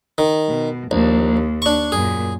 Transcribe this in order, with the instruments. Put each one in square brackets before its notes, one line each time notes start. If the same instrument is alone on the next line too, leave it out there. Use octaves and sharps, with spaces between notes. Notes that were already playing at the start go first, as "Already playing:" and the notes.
[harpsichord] D#3
[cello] B2
[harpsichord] A#1 [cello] D#2
[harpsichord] D4 C#6
[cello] F#2 A#2 [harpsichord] G#4